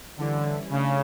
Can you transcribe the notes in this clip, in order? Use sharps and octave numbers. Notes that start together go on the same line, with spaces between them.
D3 E3 G3 C#4 E4
C#3 A3 D4